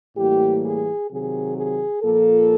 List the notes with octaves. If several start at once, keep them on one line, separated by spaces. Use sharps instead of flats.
A2 E3 G3 A#3 G4
G#4
C3 D#3 F#3 G#4
G#4
A#2 F3 A#3 A4